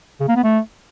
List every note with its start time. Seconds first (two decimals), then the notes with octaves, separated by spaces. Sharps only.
0.20 C#3
0.28 A#3
0.36 B3
0.44 A3